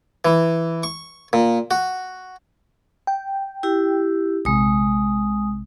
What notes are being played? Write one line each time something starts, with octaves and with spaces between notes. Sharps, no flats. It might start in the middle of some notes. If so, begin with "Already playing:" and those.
E3
C#6
A#2
F#4
G5
E4 G4
A#1 C3 G#3 D#6